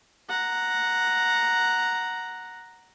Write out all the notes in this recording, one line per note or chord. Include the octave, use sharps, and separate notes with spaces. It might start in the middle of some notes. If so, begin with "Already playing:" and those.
F#5 A#5